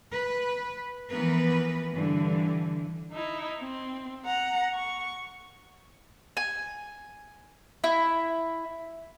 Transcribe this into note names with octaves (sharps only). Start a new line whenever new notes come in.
B4
E3 F3 B3 A#4 B4
G2 D3 E3
D#4 E4
C4
F#5 A#5
C#6
G#5
E4